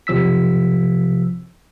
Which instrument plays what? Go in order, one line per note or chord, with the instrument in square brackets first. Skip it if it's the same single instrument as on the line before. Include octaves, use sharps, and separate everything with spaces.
[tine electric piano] B1 C3 F3 E6 B6